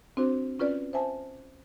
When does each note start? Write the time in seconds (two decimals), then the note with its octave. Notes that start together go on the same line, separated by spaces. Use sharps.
0.17 C4 D4 F#4 C5
0.59 C#4 F4 B4 D5
0.93 C5 E5 G#5 A5